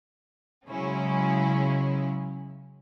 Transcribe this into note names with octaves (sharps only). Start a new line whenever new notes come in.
C#3 F#3 G#3 C#4 E4